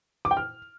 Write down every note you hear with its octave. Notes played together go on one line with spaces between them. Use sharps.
D6
G5
F6